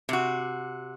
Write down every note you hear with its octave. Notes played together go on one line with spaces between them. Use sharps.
C3 F#4